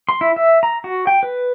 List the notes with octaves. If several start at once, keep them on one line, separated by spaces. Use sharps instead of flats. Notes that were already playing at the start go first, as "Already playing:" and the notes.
C6
E4
E5
A#5
F#4
G5
B4